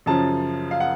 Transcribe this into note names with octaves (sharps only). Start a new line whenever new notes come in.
F#2 C#3 F3 A5
F5
F#5